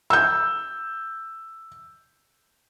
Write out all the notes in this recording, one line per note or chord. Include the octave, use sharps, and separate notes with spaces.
E6 G6